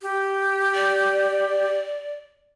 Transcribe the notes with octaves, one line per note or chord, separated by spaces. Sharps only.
G4
D5